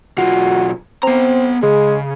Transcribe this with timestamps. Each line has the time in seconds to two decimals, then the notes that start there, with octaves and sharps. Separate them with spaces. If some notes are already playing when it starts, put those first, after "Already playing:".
0.18 B1 F4 F#4
1.03 B3 C4 A#5
1.63 C#3 G#3